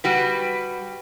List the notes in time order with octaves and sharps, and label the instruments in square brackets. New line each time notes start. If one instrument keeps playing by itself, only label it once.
[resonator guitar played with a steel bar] G3 F#4 B4